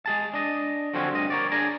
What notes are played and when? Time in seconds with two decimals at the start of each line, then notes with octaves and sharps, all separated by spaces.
0.06 G#3 G#4 A5
0.34 D4 D#5
0.93 D3 F3 F#3 C4 C#4
1.13 D2 G2 D#5
1.30 A#4 C#5 D5
1.52 D4 G#4 G#5 A#5